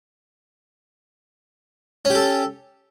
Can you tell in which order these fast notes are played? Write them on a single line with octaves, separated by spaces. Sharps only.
C#4 G4 A4